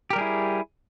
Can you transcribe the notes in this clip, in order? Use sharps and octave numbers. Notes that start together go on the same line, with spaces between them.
G3 E4 G4 G#4 A#4